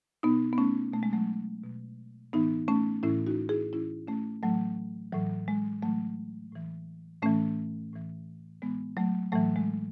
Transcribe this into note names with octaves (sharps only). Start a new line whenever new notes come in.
B2 B3 D#4
B3
A3 C#4
B2 A3
G#3
F#3 A3
B2
A2 E3 B3 D#4
A3 C#4
A2 E3 C#4 E4
D#4 F#4
E4 G#4
A2 E3 C#4 E4
A3 C#4
A2 E3 F#3 A3
A2 E3 F#3
G#3
A2 E3 F#3 A3
A2 E3
A2 E3 A3 C#4
A2 E3
A2 E3 G#3 B3
F#3 A3
A2 E3 F#3 A3
G#3